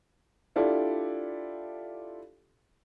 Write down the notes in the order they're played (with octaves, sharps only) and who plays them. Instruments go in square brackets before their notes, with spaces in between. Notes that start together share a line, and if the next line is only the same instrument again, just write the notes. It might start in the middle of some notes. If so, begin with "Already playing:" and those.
[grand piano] D4 E4 F4 G4 A4 D5